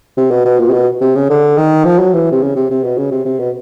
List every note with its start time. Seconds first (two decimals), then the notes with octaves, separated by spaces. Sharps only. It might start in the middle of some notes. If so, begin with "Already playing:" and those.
0.17 C3
0.31 B2
0.45 B2
0.59 A#2
0.68 C3
0.73 B2
1.01 C3
1.15 C#3
1.30 D3
1.57 D#3
1.85 F3
1.99 F#3
2.13 E3
2.32 C3
2.42 C#3
2.55 C3
2.70 C3
2.84 B2
2.97 C#3
3.11 C3
3.25 C3
3.39 B2